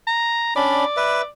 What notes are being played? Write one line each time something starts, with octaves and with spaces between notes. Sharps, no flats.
A#5
C#4 D4 D5 B5
B4 E5